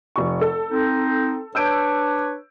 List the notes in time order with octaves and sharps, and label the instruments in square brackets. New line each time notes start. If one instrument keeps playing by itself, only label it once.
[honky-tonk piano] F1 C#6
A4
[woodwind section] C4 D#4
[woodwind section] D4 B4 C#5 [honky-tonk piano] E6 G6 D7